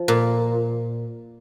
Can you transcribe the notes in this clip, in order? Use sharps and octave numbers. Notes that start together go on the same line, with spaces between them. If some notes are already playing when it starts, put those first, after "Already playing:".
Already playing: F3
A#2